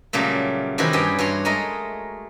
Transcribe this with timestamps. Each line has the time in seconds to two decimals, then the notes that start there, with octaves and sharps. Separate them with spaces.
0.13 A#2 C#3 F#3 G3 A3
0.78 C3 D#3 E3 D4 E4 F#4
0.93 G2 C#4 G4 G#4 G5
1.19 G2 F#4 C#5 C6
1.45 G#3 A3 A#4 D#5